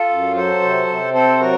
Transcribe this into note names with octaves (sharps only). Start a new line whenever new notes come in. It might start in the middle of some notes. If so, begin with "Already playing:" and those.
Already playing: F4 A4
F#2
F#3 A4 C5
C3
C3
C4 A4 C5
F#3 F#4 A#4